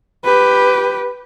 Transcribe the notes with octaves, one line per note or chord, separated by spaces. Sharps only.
G4 B4